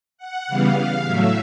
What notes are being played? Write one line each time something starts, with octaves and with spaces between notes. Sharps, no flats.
F#5
C#3 E3 G3 B3 F5
F5
A2 F#3 A3 E5